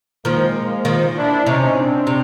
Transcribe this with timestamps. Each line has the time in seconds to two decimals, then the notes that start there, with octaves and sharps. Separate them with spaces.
0.25 D#3 F3 G#3 A#3
0.85 D#3 F3
1.16 D4 E4
1.46 C3 C#4 D#4
1.76 C4 D4
2.07 C3